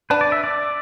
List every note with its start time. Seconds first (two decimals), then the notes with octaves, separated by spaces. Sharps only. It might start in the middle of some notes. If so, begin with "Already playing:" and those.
0.10 D4 B4
0.21 D5
0.32 E5
0.44 D5